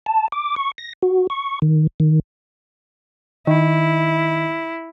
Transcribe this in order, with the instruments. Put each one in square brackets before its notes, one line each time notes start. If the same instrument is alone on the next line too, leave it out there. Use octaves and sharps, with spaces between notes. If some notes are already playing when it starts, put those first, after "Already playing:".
[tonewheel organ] A5
D6
C#6
A#6
F#4
C#6
D#3
D#3
[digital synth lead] D#3 [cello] E4